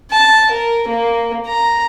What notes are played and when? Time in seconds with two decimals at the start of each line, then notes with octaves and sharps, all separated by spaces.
0.11 A5
0.51 A#4
0.88 A#3
1.47 A#5